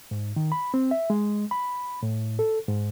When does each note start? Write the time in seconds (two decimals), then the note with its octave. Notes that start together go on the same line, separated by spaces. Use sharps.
0.11 G#2
0.36 D#3
0.52 B5
0.74 C4
0.91 E5
1.10 G#3
1.51 B5
2.03 A2
2.39 A4
2.68 G#2